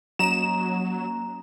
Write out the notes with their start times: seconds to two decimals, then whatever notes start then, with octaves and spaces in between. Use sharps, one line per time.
0.19 F#3 A#3 C#4 D#5 A#5 E7